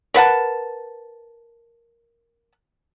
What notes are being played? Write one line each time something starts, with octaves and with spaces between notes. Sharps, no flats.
A#4 B4 F#5 A5